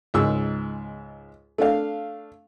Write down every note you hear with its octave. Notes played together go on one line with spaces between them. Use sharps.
C#2 G#2 E6
A3 D4 F5